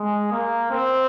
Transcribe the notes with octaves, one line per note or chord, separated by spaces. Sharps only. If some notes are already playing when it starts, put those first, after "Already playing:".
Already playing: G#3
A#3
C4